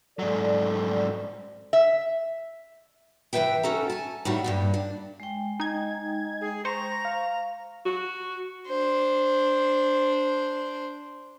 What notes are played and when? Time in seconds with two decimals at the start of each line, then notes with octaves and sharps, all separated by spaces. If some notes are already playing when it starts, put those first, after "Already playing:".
0.19 G#2 F#3 A4 D5
1.73 E5
3.33 C3 E3 F#3 B4 E5 G5
3.63 C#4 F#4 A4 A#5
3.90 G#5 A5
4.25 A2 D#3 G3 F#4
4.44 G2 A#2 G3
4.74 D4
5.20 G#3 G5
5.60 D#4 G#6
6.41 G#4
6.65 C5 A#5 C#6
7.05 F5
7.86 F#4
8.67 D4 C5